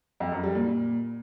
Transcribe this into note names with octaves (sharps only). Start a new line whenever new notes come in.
F2
F#2
G3
A#2